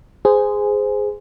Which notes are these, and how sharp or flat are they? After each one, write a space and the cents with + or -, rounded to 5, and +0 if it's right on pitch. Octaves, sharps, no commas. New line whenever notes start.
G#4 +0 C5 -20